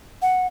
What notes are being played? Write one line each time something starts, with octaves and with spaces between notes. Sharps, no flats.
F#5